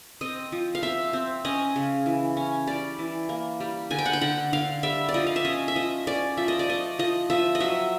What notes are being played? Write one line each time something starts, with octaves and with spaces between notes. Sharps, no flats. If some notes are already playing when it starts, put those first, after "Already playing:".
C4 D#5
F3
F5
C4 E5
C4
C#4 D#5
C#3
E3
C#4
G3 D5
E3
A#3
G3
D3 G#5
G5
F#5
G5
D3 F#5
D3 F5
G3 E5
D5
F3 D#5
F5
E5
C#4 D#5
E5
F3 D#5
C#4 D5
F3 E5
D#5
D5
A3 D#5
F3 D#5
F3 E5
D#5
F#3 E5